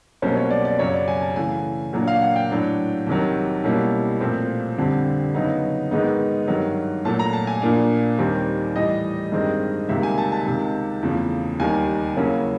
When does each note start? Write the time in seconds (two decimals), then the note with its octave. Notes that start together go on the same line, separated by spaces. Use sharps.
0.22 C2 B2 F#3 A#3 C#4 C5
0.37 C#5
0.51 D5
0.65 D5
0.79 F#2 C#3 F#3 C#5
0.94 D5
1.08 G#5
1.22 A5
1.36 C#3 E3 A3 G#5
1.93 A#2 F#3 A#3 D4
2.07 F5
2.22 F#5
2.36 G5
2.50 A2 F#3 A3 D4
3.07 C2 C3 D#3 F#3
3.64 B2 G3 A#3 C#4 E4
4.21 A#2 F3 A3 C4
4.77 F2 D3 G3 C4
5.34 C#3 F#3 B3 D#4
5.91 G#2 D#3 G#3 B3 D#4
6.48 G2 D#3 F#3
7.05 A#2 F#3 A3 A5
7.19 A#5
7.33 A5
7.47 G#5
7.62 A#2 F3 A#3 D4
8.18 D#2 D#3 G3 C4
8.76 A2 E3 G3 D#5
9.32 G2 D#3 G#3 C4
9.89 C#2 C3 D#3 G3 A#3 E5
10.03 G#5
10.18 A5
10.32 A5
10.46 C#2 C3 D#3
11.03 E2 C#3 F3 A3
11.60 D#2 D#3 G3 G#5
12.17 C#3 F#3 A#3 C#4 E4